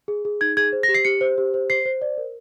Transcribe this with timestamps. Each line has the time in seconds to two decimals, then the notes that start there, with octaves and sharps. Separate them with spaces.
0.08 G#4
0.25 G#4
0.41 D#4 G#6
0.57 G#4 G#6
0.73 C5
0.83 A#6
0.88 G4
0.94 C7
1.05 G4 C#7
1.21 C5
1.38 G4
1.54 C5
1.70 C5 C7
1.85 C5
2.02 D5
2.18 A#4